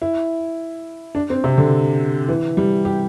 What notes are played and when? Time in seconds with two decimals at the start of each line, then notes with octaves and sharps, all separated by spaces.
0.02 E4
1.15 D4
1.30 C4
1.44 C3
1.58 D3
2.28 E3
2.57 G3
2.85 G4